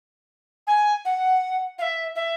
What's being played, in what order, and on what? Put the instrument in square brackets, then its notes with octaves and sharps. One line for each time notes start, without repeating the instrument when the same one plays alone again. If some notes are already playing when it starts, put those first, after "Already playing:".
[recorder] G#5
F#5
F5
E5
E5